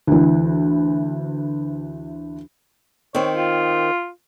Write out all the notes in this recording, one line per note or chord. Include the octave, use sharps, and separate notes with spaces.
D2 E3
D#3 C4 C#5
F4